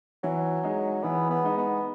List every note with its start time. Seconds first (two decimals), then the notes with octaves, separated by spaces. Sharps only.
0.23 E3 F#3
0.63 G#3 D#4
1.03 E3 B3
1.30 B3
1.44 G#3 D#4
1.58 B3